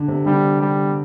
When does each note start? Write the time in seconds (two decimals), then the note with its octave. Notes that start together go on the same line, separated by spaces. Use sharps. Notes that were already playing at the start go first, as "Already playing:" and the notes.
Already playing: D3
0.08 C3
0.26 D3 G3
0.62 G3